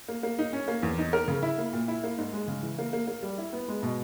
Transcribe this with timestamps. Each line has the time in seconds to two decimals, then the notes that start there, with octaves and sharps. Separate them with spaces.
0.08 A#3
0.23 A#3
0.39 D#4
0.53 C#4
0.68 A#3
0.83 E2
0.98 D#4
1.13 A#4
1.28 C#3
1.43 E4
1.58 A#3
1.73 A#2
1.88 E4
2.04 A#3
2.18 G#2
2.33 G#3
2.48 C#3
2.63 E3
2.79 A#3
2.93 A#3
3.07 A#3
3.23 G3
3.38 E4
3.53 B3
3.68 G#3
3.83 B2